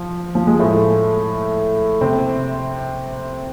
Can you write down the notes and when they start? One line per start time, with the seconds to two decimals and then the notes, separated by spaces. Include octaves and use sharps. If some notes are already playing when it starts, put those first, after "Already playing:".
Already playing: F3
0.35 F3
0.47 G#3
0.59 A2 A3
2.01 C3 C4